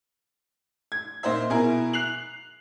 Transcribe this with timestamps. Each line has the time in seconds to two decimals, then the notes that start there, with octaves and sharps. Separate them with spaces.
0.92 G#6
1.23 A#2 D#4 C5 E5
1.50 B2 E4 G#4 A#4
1.93 F#6 C7 F7 F#7